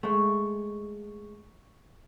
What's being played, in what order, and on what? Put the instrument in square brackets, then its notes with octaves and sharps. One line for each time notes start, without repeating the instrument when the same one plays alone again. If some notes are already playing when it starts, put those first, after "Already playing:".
[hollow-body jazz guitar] G#3 A3 [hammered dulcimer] C#6